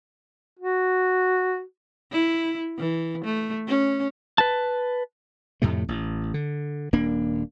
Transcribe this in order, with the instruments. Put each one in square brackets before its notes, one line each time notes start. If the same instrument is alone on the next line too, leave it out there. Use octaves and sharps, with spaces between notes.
[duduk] F#4
[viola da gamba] E4
E3
A3
C#4
[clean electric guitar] B4 A5
[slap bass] F2 A2 C3 A3
A1
D3
D#1 A#3 D4